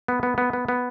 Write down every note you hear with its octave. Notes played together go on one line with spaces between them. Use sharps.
B3
B3
B3
B3
B3